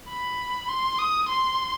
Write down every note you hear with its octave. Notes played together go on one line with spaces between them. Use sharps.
B5
C6
D#6
C6